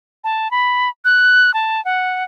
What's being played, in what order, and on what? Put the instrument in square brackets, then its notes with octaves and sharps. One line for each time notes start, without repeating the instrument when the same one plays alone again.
[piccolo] A5
B5
F#6
A5
F#5